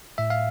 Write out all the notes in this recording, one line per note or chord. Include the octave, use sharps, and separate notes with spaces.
A2 E5
F5